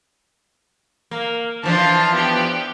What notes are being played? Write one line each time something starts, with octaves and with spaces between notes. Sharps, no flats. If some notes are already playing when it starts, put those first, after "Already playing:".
A#3
E3 F3 D4 F4 A5
B3 G4